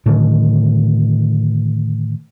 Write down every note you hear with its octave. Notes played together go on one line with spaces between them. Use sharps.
A2 D3 D#3